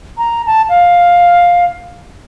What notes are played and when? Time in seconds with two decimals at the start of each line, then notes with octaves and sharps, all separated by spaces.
0.18 A#5
0.46 A5
0.69 F5